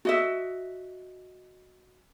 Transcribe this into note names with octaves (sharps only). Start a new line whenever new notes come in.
F#4 D#5 E5